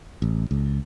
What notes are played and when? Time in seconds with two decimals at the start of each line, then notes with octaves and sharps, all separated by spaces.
0.22 A1
0.51 C#2